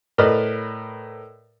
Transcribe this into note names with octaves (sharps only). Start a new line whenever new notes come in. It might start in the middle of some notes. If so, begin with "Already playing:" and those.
A2 A#4 B4 D5 D#5 F6